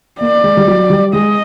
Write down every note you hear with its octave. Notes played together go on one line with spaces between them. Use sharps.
A#3 D5
G#3
G3
F#3
G3
G#3 D#5